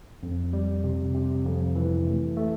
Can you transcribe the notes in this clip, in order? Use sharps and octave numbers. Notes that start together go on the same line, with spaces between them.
F2
G3
C3
C3
F2
E3
A3
A3